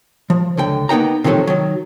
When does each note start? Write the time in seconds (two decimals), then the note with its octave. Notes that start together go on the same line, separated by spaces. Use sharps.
0.30 F3
0.57 C#2 D3 G5
0.89 A#3 B3 D#4 G5 A#5
1.24 C3 D#3 F3 F#3 A3
1.47 D#3 F#3